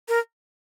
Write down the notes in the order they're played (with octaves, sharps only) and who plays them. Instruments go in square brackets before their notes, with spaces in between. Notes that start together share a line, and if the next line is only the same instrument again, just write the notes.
[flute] A#4